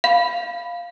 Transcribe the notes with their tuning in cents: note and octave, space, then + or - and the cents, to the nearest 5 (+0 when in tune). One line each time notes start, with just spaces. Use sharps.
F5 +0 B5 +0